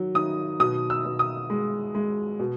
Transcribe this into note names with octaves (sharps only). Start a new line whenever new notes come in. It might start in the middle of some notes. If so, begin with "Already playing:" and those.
Already playing: D#3 F#3
D#3 D#6
B2 D#6
E6
B2
D#6
G#3
G#3
B2